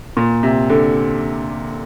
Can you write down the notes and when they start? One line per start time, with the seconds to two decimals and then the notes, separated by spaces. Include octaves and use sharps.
0.17 A#2
0.43 C3
0.70 D3